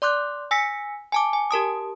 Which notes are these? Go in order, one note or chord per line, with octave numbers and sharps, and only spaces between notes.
D5 C6 D6 F#6 G6
G#5 E6 A#6 B6 C#7
G#5 A5 D6
G#5
G4 A#4 A5 D#6